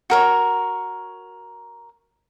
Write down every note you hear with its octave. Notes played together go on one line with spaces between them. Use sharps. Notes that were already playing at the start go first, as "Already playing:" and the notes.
F#4 A#4 C#5